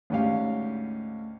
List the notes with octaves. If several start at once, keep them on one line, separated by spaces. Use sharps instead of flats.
D2 G#2 C#4 G4 F5